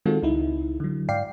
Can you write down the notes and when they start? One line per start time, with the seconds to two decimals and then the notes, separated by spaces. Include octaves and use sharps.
0.06 D#3 G#3 C4 F4 F#4 A4
0.23 C#2 D#4 E4
0.80 D3 F#3
1.08 G#2 D5 F5 G5 C7